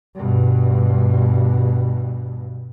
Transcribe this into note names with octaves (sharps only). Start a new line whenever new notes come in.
G2 B2